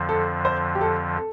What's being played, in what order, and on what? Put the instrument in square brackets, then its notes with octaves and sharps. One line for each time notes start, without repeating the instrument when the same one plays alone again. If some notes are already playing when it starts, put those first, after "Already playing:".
Already playing: [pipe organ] F2 D3 F3
[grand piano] A4
C5
G4
A4
A4